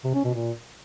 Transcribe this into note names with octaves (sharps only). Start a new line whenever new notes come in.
C3
C#4
B2
A#2